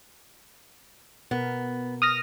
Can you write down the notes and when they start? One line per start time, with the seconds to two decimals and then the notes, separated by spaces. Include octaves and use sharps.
1.31 B2 B3 A#4
2.02 D#6 F6 A#6